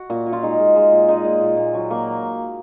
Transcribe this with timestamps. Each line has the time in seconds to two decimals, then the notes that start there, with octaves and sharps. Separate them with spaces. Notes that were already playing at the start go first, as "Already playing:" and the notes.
Already playing: F#4
0.10 A#2
0.26 A#2
0.33 F4
0.43 G#3 D#4
0.59 G#3
0.76 G#3
0.92 A#2
1.08 G#3 D#4
1.25 A#2
1.41 A#2
1.57 A#2
1.74 F#3
1.90 A#3